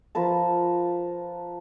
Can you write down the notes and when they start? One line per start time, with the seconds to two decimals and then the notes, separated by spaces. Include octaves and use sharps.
0.15 F3 A#4 B4 A5